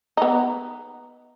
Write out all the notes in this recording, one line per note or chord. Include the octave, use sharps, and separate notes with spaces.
B3 D#4